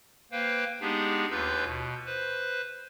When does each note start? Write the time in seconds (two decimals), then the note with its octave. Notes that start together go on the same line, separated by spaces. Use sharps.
0.32 A#3 B4 C5 F5 G5
0.81 G#3 B3 D4 D#4 G4 G#4
1.31 D#2 F4 B4 E6 G6
1.65 B2
2.06 B4 C5